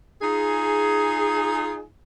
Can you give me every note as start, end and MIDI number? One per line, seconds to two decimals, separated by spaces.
0.22 1.84 63
0.22 1.84 65
0.22 1.84 68